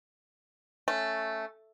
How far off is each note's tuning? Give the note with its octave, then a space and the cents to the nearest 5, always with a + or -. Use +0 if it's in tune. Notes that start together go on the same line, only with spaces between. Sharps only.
A3 +0 C#4 +0